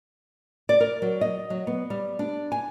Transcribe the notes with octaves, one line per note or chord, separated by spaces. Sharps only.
D5
A#4
F#3
D#5
F#3
B3
G3
D4
G#5